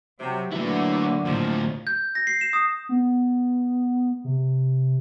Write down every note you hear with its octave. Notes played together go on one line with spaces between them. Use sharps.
C3 F#3
D3 E3 F#3 A3 A#3 E4
D2 A2 F3
G6
A#6
C7
E7
D#6
B3
C3